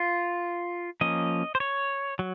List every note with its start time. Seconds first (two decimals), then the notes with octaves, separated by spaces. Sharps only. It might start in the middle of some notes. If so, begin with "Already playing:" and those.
Already playing: F4
1.01 F3 A#3 C#4 D#5
1.55 C5
1.60 C#5
2.19 F#3